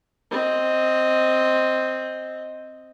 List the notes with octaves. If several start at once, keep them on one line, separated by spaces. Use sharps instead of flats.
C4 D#5